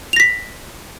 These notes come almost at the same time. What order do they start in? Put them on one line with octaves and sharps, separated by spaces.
F7 A#6 B6